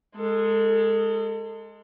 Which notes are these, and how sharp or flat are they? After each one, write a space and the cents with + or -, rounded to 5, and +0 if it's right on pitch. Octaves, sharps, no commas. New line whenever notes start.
G#3 +0 A4 +35